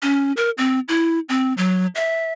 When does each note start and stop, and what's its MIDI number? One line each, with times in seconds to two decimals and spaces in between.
0.03 0.32 61
0.37 0.50 70
0.58 0.80 60
0.88 1.19 64
1.29 1.53 60
1.57 1.86 54
1.95 2.33 76